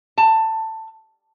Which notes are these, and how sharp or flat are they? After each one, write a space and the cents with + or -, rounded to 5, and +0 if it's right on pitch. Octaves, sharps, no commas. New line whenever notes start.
A5 +15